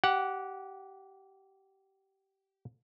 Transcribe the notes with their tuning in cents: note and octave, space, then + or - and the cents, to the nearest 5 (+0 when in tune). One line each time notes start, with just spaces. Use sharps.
G4 -20 F#5 +0